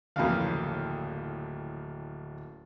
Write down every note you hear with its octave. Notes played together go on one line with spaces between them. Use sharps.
D1 F2 C#3 E3 A#3 F5